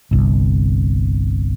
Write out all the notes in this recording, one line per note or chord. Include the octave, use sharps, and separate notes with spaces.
G1 C2